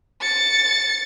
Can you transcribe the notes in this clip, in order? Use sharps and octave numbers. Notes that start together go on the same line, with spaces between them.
A6 C#7